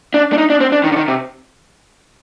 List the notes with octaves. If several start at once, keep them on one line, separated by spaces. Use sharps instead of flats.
D4
D4
D#4
D4
C4
D4
D#3
D3
D#3
C3